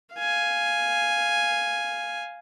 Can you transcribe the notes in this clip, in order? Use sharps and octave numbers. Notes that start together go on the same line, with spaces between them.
F5 G#5